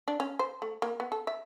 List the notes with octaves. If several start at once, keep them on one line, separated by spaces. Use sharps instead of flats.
D4
C#4
C5
A3
A#3
B3
A4
E5